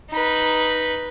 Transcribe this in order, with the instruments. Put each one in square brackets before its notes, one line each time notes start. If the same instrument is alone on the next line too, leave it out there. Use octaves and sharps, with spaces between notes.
[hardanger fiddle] D#4 B4